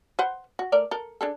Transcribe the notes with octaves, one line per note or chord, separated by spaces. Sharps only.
B4 C5 F#5
F#4
A3 A#4 D5
A4 A#4
D4 G#4 A4